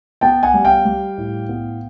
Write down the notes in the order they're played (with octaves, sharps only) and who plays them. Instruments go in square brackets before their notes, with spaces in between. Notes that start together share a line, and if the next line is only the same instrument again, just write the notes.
[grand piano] B3 G5 A5
F#5 G#5
G3
F5 G5
G3
A2
B3